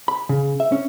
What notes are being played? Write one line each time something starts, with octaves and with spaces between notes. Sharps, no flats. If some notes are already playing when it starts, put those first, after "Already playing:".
B5
C#3
E5
C#4